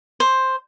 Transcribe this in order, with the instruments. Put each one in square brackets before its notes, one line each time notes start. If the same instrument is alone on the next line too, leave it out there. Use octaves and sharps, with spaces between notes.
[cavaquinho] C5